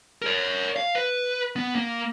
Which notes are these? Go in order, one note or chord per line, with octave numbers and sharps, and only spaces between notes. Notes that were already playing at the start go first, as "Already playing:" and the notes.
A#4 C#5
F5
B4
B3
A#3